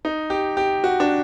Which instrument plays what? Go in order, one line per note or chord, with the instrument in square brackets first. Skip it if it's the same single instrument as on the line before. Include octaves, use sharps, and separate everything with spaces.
[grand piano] D#4
G4
G4
F#4
D4